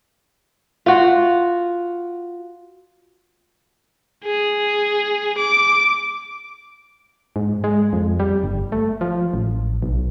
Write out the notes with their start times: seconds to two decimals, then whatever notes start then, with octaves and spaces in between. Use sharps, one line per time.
0.86 F4 F#4
4.24 G#4
5.38 D6
7.36 G#2
7.64 G#3
7.93 F2
8.20 G3
8.43 G1
8.72 A3
9.01 F3
9.33 A1
9.82 B1